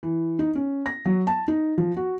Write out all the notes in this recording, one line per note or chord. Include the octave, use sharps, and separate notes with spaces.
E3
D#4
C#4
A#6
F#3
A5
D#4
F3
F#4